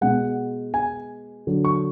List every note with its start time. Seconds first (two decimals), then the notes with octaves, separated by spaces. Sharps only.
0.01 B2 G#3 F#5
0.74 G#5
1.47 D3 F#3
1.65 C#6